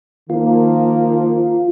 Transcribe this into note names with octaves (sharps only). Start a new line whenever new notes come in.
D#3 F3 A#3 F4